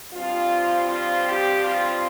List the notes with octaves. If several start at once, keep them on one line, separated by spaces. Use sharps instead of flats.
G2 F3 C4 F4
F4
G4
F4